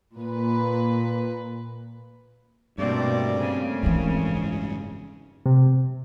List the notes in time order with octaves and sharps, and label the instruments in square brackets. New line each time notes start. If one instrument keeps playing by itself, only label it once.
[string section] A#2 B4
[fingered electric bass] G2 [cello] B2 D5 [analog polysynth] A3 A#3 C4
[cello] C#3
[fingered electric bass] F#1 G#2 [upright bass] E3 G3
[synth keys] C3